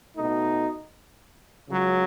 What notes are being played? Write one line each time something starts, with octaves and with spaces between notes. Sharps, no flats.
B2 A3 D#4
C#2 C#3 F#3